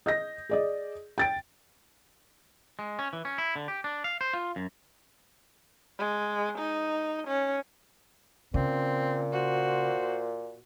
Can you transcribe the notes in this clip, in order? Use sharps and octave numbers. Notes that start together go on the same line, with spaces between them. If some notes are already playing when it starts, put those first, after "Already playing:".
D#5 G6 A#6
G#4 D5 D#5
G5 A6 D7
G#3
C#4
E3
C#4
E4
D3
G4
D4
F5
C5
F4
F#2
G#3
D#4
C#4
A#2 C#3 C4
F#4 C5